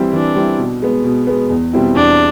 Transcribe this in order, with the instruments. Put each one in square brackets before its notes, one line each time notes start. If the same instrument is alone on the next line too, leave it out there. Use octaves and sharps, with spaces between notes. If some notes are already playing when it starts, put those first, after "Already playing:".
Already playing: [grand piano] E3 G3 C4 E4
[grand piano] E3 [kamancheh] D4
[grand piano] G3 C4 E4
B2
G#3 B3
B2
G#3 B3
E2
B2 G3 C4 E4
[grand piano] E2 [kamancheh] D4